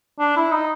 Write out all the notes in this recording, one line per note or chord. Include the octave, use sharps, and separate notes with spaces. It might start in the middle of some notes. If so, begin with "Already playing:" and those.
D4
E4
D#4